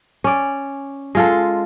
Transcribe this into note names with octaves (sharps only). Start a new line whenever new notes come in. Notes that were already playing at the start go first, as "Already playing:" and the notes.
C#4 D5
G#3 F4 A4